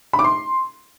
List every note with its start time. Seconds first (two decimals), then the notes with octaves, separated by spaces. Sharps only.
0.13 B5
0.19 D6
0.24 C6